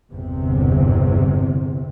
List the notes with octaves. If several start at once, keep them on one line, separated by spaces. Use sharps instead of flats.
G1 E2 C3